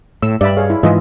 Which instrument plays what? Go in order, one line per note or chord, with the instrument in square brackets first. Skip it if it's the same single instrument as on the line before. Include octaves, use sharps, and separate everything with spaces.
[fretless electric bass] A2 [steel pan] E6
[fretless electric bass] G2 [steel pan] D5 E5 B5
[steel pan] G#4 C#5 F5
E4
[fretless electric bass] G#2 E3 G#3 [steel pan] F4 D#5 E5